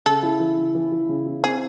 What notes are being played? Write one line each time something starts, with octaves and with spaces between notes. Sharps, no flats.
C#3 A4
E4
E3
C#3
E3
E3
C#3
E4
C4 G#4